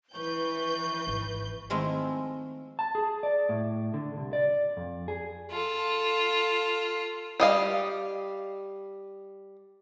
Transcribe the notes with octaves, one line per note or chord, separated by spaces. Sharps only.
E3 B4 C#6 G6
G#1
D#3 F3 G#3 A3 C4 E4
A5
G#4
D5
A2
D3
C2
D5
F2
G#4
F4 A4
G3 D#5 F5